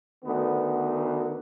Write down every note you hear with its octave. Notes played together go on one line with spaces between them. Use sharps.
D2 D#3 B3